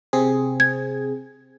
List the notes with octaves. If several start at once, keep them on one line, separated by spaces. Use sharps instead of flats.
C3 C4 G#4
G#6